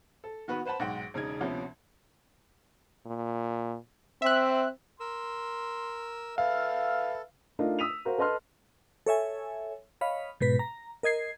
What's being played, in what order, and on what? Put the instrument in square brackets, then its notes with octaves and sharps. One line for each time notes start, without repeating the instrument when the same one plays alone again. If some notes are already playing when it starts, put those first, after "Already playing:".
[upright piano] A4
D#3 B3 F#4 B4
B4 C5 F#5 A5 B5
B1 G#2 F#5 G5 D7
E1 C#3 D#4 G#6
D2 C3 F3 B3 C#4
[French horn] A#2
[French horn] C4 [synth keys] E5 F#6
[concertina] A#4 E6 [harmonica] C6
[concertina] A4 [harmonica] B4 E5 F6 [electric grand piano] F5
[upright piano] A3 D4 D#4 F4 A#4
D#6 E6 B6 D#7 F7
F#4 A#4 C5 F5
A4 B4 D#5 A5 C6 F6
[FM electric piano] A4 C#5 E5 G#5
C#5 D#5 F5 B5
G#2 B2 B4 B6
A#5
A#4 D#5 G#6 C7